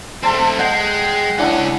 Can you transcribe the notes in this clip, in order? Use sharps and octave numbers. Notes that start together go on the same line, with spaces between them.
A3 C4 A4 A5 C6
G#3 F#5 G5
C#2 C#4 D4 E4 F#5